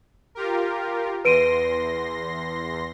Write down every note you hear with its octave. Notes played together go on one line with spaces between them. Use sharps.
F4 G4 A#4
E2 B4 C6 A#6 D7 D#7